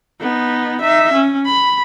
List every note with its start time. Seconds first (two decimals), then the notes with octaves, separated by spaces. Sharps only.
0.21 B3 D#4
0.82 D#4 E5
1.14 C#4
1.46 B5